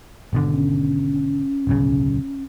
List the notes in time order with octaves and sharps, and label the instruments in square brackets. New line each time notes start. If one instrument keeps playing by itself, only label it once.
[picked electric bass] G#1 B2 D3
[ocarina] C#4
[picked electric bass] D1 B1 C#3